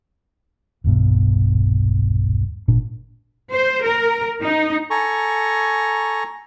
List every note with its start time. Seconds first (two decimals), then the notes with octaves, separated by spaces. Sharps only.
0.84 D#1 B1 G2 B2
2.68 G#1 A#2 D4
3.52 C5
3.85 A#4
4.43 D#4
4.90 A4 G#5 A#5 C#6